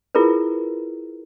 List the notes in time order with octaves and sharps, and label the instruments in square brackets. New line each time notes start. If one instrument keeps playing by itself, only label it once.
[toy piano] E4 F4 G#4 A#4 B4